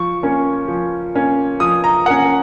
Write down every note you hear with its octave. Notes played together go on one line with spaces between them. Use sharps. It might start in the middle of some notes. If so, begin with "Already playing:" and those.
Already playing: F3 C#6
A#3 C#4
F3
A#3 C#4
F3 D#6
A#5
A#3 C#4 F#5